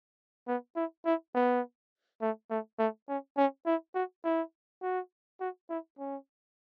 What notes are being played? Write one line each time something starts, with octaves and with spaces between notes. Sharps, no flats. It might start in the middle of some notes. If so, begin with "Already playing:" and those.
B3
E4
E4
B3
A3
A3
A3
C#4
C#4
E4
F#4
E4
F#4
F#4
E4
C#4